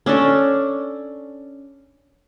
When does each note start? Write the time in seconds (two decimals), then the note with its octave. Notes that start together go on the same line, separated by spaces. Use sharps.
0.06 C#4 D4 A4 D5